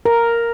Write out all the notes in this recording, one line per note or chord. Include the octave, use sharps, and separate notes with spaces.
A#4